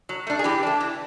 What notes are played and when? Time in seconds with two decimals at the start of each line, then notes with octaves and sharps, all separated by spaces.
0.09 F#3
0.27 A3 D4
0.39 G#4
0.44 E3 G4
0.63 A3 D4
0.81 E3